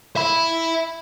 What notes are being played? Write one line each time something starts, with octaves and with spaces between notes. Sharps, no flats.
E5 B5